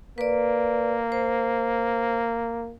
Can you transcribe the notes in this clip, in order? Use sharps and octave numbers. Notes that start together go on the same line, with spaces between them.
A#3 B4 D5
C5